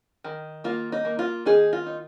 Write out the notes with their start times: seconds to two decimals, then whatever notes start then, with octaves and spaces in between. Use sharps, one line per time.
0.24 D#3
0.64 A#3 F4
0.92 D#4
1.05 A#3
1.19 F4
1.45 D#3 D#4 G#4
1.73 F4
1.86 D#4